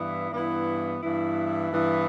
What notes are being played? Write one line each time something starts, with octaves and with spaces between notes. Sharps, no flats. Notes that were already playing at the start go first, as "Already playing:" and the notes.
Already playing: G2 E3 B3 E4
G2 E3 B3 E4
G2 E3 B3 E4
G2 E3 B3 E4